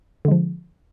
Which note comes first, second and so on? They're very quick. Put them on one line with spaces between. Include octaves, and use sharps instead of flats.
D3 G#3 F3